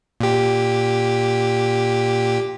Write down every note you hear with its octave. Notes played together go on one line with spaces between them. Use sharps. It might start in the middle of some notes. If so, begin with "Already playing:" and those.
A#2 G4